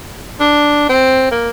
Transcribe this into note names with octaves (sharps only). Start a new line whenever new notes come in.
D4
C4
A#3